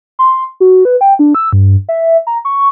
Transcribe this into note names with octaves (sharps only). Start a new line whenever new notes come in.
C6
F#4
B4
G5
D4
E6
G2
E5
A#5
C#6